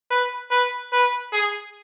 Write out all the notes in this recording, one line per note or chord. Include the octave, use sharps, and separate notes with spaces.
B4
B4
B4
G#4